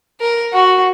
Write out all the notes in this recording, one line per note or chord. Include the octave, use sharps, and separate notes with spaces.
A#4
F#4